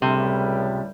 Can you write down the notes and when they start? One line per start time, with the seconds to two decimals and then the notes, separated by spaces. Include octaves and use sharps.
0.02 C#2 A2 C3 G3